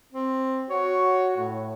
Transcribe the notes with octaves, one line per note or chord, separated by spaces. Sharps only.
C4
F#4 C#5
A2